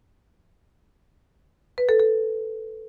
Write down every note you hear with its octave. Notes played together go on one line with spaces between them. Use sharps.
B4
A4
A4